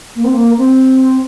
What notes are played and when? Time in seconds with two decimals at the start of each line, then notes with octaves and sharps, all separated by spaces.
0.16 A#3
0.24 C4
0.33 A#3
0.58 C4